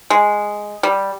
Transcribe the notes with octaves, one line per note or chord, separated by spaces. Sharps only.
G#3
G3